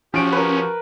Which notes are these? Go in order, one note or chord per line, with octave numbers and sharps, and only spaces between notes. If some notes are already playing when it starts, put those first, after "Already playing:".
F3 C#4 F#4 G4 D7
A#4 B4